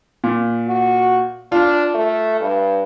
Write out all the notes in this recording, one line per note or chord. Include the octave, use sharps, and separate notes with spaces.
A#2
F#4
D4 F4
A3
G2